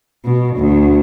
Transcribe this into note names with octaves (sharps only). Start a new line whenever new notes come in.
B2
D2